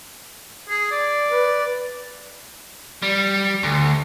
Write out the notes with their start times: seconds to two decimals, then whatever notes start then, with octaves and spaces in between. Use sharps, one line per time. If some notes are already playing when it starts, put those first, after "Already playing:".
0.69 G#4
0.91 D5
1.31 B4
3.02 G3
3.63 D2